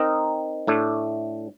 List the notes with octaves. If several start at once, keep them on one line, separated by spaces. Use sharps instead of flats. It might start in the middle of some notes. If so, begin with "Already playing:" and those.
Already playing: C4 D#4 A#4 D#5
A2 A3 D4